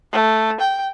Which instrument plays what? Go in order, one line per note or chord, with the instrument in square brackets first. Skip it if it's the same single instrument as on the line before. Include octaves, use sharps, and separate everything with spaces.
[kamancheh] A3
G5